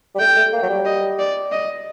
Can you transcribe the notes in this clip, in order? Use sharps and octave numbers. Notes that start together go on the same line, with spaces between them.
G3
A3 G5
A3
A#3
F#3
G3
D#5
D5
D#5